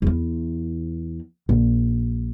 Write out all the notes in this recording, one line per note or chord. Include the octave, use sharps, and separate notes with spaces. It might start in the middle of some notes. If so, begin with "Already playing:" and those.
E2 E3
A#1